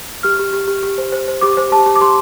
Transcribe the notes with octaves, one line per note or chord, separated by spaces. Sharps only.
G4 F6
G4
G4
G4
G4
C5
C5
C5
G4 D6
C5
G4 A5
G4
D6
G4 C6